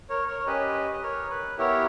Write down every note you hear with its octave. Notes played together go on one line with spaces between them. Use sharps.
A#4 C#5
A#4 C#5
C#5
C#4 G4 B4 D#5
D#5
A#4 C#5
B4
B3 E4 G4 A#4 C#5